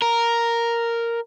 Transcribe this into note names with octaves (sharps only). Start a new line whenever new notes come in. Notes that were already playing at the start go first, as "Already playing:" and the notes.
A#4